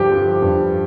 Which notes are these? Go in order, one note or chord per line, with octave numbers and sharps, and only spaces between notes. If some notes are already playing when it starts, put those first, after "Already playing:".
Already playing: G2 D3 F3 G4
F3
G2